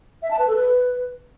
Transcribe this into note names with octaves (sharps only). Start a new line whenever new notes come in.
E5
A5
B4
A4
B4